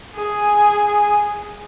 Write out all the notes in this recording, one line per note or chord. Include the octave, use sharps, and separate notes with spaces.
G#4 G#5